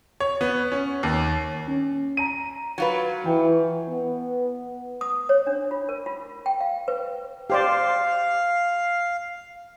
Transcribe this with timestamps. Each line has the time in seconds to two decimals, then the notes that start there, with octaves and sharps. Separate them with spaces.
0.20 C#5
0.41 B3
0.72 C#4
1.03 D#2
1.68 C#4
2.17 A#5 D#7
2.78 F#3 F4 B4
3.25 E3 G5
3.89 B3
5.01 D#6
5.29 C#5
5.47 D4
5.71 F4
5.89 A#4
6.06 F4
6.46 G5
6.61 F5
6.88 B4
7.50 G4 C5 D5 F5